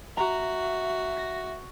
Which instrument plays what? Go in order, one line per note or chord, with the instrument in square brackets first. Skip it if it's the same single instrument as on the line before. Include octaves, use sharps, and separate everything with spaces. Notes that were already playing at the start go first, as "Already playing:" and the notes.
[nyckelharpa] F#4 [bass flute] E5 [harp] A#5
[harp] A#6